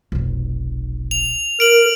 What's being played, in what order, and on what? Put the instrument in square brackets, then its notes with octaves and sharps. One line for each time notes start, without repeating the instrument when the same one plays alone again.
[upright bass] F1 B1
[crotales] F7
[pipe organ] A#4 [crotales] D7 F#7